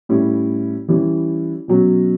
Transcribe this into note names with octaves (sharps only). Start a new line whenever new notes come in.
A2 G3 C#4 E4
E3 G3 C#4 E4
B2 F#3 C#4